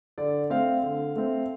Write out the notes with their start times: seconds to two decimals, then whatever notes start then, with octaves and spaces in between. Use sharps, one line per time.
0.18 D3 D5
0.50 A3 C4 F5
0.83 D3
1.16 A3 C4